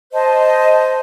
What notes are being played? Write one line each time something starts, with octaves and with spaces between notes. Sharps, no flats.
C5 D#5 A5